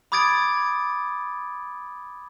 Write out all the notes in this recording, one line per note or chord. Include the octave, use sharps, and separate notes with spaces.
B5 D6 D#6 G#6 A6 D7